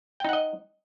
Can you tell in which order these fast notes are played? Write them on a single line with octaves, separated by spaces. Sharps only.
G5 D#4 F#5 D#5